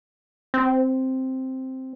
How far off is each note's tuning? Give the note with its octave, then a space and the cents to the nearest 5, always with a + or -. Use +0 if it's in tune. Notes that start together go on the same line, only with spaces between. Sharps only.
C4 +0